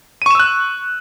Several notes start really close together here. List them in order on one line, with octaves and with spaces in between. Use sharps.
D#7 C#6 E7 E6 F#6